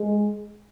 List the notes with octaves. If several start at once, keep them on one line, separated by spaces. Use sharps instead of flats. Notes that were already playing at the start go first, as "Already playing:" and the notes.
Already playing: G#3